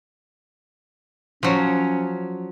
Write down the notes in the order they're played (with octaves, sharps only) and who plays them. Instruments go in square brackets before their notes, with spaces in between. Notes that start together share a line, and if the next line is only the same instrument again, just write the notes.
[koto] F3 F#3 [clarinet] C#4